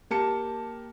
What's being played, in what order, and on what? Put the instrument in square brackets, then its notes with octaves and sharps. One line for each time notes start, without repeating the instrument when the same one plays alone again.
[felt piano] A#3 G4 A5 C#7